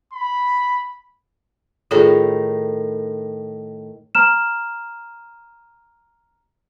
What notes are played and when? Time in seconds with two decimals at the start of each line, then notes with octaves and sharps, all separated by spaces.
0.14 B5
1.91 A2 D#3 F4 G#4 C#5
4.15 A#5 F6 E7